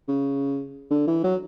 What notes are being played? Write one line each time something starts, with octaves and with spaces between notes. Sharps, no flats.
C#3
D3
E3
F#3